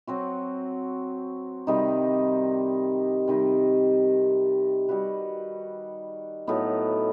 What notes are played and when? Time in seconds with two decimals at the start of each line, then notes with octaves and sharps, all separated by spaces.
0.07 F#3 C4 F#4
1.67 C3 D#3 G3 D#4
3.28 C3 D#3 G3 D#4
4.88 G3 D#4 F#4 B4
6.47 A2 F#3 B3 D#4